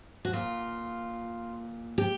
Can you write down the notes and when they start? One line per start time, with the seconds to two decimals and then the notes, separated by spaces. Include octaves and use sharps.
0.25 F#4
0.33 A#2 F4
1.98 G4